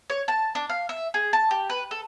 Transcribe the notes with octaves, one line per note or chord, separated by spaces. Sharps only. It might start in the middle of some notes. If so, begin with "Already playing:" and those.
C#5
A5
D4
F5
E5
G#4
A5
G4
B4
A4